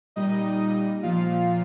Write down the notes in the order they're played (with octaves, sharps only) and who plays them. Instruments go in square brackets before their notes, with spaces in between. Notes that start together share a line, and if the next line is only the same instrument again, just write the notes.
[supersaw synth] A#2 G3 D#4 D#5
A#2 F3 F4 F5